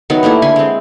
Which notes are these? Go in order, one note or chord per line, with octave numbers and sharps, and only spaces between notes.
D#3 F#3 B3
G3 A3 A#3 E4
D3 G#5 B5 C6
G#3 C4